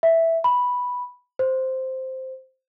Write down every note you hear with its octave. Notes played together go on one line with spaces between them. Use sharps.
E5
B5
C5